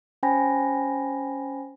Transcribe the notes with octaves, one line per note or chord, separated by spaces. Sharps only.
C#4 C5 G5 G#5 B5 A#6